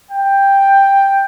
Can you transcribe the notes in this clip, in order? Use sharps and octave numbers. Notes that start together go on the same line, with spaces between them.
G5